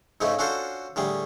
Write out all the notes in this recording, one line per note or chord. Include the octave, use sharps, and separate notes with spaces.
G#2 C#3 A3 D#4 E4
C#4 D4 F4 F#4 A4 C5
A2 D3 G3 G#4